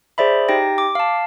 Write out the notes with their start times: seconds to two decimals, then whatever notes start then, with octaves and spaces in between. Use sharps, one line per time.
0.18 G#4 C5 D5 E5 B5
0.49 D#4 G4 G5 A#6
0.78 D6
0.95 F5 A5